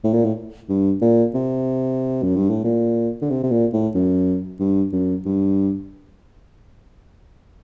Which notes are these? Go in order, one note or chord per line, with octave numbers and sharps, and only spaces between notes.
A2
A#2
A2
G2
A#2
C3
F#2
G2
A2
A#2
D3
C3
C3
A#2
A2
F#2
G2
F#2
G2